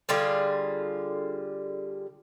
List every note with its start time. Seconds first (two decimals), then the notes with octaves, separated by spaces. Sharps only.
0.09 D3 G3 F4 G#4